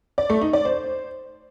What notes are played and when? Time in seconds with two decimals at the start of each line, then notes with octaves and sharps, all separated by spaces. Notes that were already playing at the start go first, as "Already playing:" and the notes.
0.18 D5
0.30 A3
0.42 D#4
0.53 D5
0.65 C5